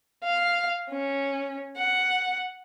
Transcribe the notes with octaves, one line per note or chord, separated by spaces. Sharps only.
F5
C#4
F#5